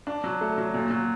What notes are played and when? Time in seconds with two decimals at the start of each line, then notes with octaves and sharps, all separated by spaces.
0.07 D4
0.24 F#3
0.41 A3
0.58 F#3
0.74 A#2
0.90 F#3